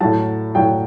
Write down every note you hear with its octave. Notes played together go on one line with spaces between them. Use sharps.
A2 F#3 A5
A2 F#3 G5